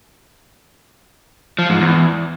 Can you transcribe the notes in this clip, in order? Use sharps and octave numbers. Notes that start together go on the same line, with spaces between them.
F3
G#2
E2